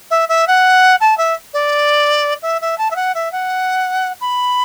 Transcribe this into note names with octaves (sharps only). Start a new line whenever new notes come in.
E5
E5
F#5
A5
E5
D5
E5
E5
A5
E5
F#5
E5
F#5
B5